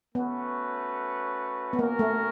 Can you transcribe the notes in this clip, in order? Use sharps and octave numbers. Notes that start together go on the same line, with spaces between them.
A3 B3 C#4 F#4 B4
B3
A#3 C#4 F#4 A#4
A3